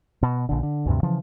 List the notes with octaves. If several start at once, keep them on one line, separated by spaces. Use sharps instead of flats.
B2
A#1 D3
D3
D2 G2 C3
C#3 E3 F3